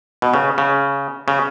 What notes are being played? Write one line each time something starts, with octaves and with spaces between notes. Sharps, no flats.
B2
C#3
C#3
C#3